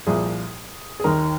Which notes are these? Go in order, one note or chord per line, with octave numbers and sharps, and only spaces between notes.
C2 A#2 F3 G#4
G#4
D#2 D#3 A#4